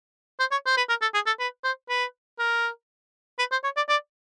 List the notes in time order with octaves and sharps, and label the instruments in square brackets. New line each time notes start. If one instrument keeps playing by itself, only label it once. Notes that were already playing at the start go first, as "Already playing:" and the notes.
[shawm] C5
C#5
C5
B4
A#4
A4
G#4
A4
B4
C5
B4
A#4
B4
C5
C#5
D5
D5